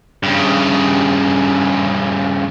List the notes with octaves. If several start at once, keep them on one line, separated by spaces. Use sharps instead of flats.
G2 C#3